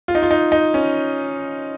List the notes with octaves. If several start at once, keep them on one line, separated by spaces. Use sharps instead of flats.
F4
D#4
F4
D#4
D#4
C#4